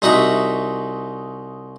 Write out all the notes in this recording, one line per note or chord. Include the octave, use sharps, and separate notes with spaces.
C2 D#4 F#4 E5 C#6